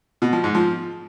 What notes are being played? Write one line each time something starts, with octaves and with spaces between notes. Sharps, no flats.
B2
F3
G#2
F3